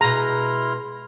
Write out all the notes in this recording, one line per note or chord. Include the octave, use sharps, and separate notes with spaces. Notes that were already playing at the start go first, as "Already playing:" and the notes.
B2 G#3 E4 A#5 C6 F6